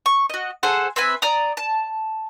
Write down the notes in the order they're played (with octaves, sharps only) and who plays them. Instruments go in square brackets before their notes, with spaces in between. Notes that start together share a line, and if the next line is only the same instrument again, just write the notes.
[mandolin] C#6
F#4 D#5
G#4 A4 C5 F#5
C4 B4 E5 G#5
D5 A#5 D#6
A5